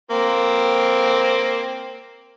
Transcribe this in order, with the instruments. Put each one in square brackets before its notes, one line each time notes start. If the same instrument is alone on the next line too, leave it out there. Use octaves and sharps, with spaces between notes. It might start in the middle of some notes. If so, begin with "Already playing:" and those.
[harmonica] A#3 C4